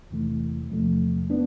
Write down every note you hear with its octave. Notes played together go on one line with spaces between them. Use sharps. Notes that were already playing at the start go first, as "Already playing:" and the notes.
E2 C3 E3 A3
E2 C3 F3 A3
B3 D4